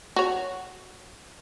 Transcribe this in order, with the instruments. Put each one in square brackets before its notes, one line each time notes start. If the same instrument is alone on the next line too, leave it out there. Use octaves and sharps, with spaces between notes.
[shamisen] F#4 C#5